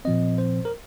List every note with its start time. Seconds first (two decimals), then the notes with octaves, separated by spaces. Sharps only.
0.05 A#2 F3 C4 D#5
0.38 C5
0.65 A#4